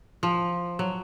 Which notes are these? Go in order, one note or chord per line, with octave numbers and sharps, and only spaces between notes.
F3
F#3